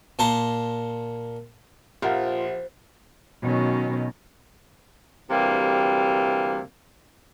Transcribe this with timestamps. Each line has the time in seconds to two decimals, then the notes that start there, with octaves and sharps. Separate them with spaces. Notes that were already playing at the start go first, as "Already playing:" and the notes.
0.19 A#2 A5 A#5 C6
2.02 A#1 F3 F4 G4 A#4 E5 F#5
3.42 B2 D#3 F#3 C#4
5.30 D2 C3 E3 G3 A#3